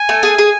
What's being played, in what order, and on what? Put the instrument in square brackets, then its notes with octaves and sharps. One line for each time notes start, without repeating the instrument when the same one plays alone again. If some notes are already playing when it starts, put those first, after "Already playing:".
Already playing: [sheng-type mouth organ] G#5
[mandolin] A3
G#4
G#4